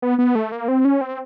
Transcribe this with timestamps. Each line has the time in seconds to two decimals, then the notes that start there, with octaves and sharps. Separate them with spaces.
0.02 B3
0.18 B3
0.35 A3
0.52 A#3
0.68 C4
0.85 C#4
1.01 C4